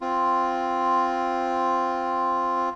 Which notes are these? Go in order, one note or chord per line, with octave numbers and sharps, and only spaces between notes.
C4 F4